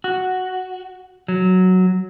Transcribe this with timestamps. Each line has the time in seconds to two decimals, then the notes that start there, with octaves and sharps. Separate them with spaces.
0.04 F#4
1.28 F#3